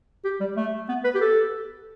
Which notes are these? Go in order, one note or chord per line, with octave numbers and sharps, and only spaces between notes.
G4
G3
A3
B3
B4
G4
A4